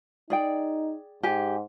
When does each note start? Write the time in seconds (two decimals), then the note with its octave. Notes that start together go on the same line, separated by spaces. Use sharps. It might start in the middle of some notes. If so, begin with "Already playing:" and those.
0.30 D#4 G#4 D5 G5
1.23 G#2 G4 G#5